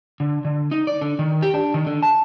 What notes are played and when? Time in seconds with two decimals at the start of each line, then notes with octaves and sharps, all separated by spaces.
0.20 D3
0.45 D3
0.71 D#4
0.87 D5
1.01 D3
1.19 D#3
1.42 G4
1.54 D4
1.74 D#3
1.86 D3
2.03 A5